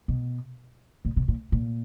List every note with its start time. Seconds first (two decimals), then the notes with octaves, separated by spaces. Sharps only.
0.08 B2
1.05 A#2
1.16 B2
1.28 A#2
1.52 A#2